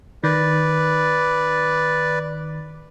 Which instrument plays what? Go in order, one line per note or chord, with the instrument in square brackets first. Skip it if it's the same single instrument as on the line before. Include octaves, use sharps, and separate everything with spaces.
[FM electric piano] D#3 [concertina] B4 D5